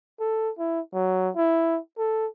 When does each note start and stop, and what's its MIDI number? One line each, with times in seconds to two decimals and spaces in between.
0.20 0.51 69
0.59 0.80 64
0.94 1.30 54
1.36 1.79 64
1.98 2.27 69